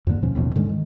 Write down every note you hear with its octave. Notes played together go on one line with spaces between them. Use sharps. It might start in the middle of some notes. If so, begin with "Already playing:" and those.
F2 G#2 D3 A#3
D#2 B2 F3 C#4
A1 D#2 B2 F3
G#2 D3 D#3 G#3
D#3